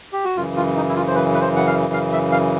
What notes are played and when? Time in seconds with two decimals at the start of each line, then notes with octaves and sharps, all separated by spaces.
0.13 G4
0.25 F#4
0.37 F#2 C#3 E3 F4
0.56 F4
0.76 D#4
0.89 E4
0.96 F4
1.07 C5
1.15 B4
1.34 B4
1.41 C5
1.56 F#5
1.67 F5
1.93 F5
2.13 E5
2.32 F5